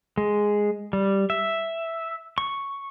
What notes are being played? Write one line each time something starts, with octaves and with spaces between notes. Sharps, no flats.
G#3
G3
E5
C#6